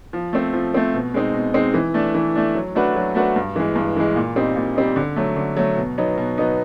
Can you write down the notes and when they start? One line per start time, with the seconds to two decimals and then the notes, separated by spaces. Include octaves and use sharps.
0.13 F3
0.33 A3 C4
0.53 F3
0.74 A3 C4
0.94 B2
1.14 G#3 C4 D#4
1.34 B2
1.54 G#3 C4 D#4
1.74 E3
1.94 A3 D4
2.15 E3
2.35 A3 D4
2.55 F#3
2.75 A3 D4 F#4 B4
2.96 F#3
3.15 A3 D4 F#4 B4
3.36 G2
3.56 E3 G#3
3.76 G2
3.96 E3 G#3
4.16 A#2
4.36 G3 C4 D#4
4.56 A#2
4.76 G3 C4 D#4
4.96 D3
5.16 F#3 A3
5.36 D3
5.57 F#3 A3
5.77 B2
5.98 F#3 B3 D#4
6.17 B2
6.38 F#3 B3 D#4